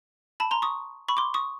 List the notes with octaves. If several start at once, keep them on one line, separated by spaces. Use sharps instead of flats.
A5 B5
A#5 C6
C#6 D#6
B5 C#6
C6 D6
C#6 D#6